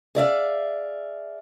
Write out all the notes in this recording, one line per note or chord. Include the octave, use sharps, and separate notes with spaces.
G#4 D5 E5 F5